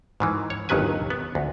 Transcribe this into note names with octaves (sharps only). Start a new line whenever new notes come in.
G#2 D#3 E3
C#5
G1 D#2 D#3 F#3 B4 G#5
B3
D2